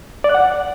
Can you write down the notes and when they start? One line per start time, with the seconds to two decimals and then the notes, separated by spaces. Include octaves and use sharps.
0.24 D5
0.29 F#6
0.35 F#5